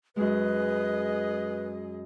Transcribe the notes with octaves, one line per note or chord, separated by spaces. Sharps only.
F#2 G#3 G#4 B4 D#5